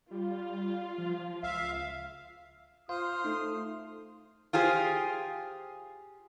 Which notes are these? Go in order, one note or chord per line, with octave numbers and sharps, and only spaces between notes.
G3 F4
F3
C#2 E5 F5
F4 C5 F5 D#6 F6
A3 D#4
F4 G4 G#4 C5